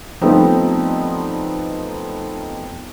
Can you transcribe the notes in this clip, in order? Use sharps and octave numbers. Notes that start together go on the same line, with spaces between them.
F3 G3 A3 B3 C4 D#4